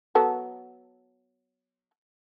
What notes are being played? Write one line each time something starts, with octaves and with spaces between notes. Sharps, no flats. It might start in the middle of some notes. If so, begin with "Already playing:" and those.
F#3 B3 A4